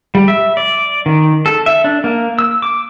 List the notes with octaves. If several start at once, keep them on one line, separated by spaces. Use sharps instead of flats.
G3
E5
D5
D#3
A4
E5
D4
A#3
E6
D6